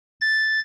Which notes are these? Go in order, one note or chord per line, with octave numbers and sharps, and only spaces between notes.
A6